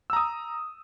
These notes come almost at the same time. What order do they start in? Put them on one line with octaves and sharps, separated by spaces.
E6 A#5 D#6